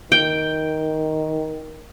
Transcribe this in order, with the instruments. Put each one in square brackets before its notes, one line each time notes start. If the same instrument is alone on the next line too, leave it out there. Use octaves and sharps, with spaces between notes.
[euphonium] D#3 [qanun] G5